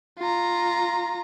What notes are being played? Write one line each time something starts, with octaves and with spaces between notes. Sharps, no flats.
F4 A#5